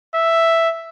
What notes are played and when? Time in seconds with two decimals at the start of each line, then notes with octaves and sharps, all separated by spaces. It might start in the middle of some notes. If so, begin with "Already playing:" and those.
0.15 E5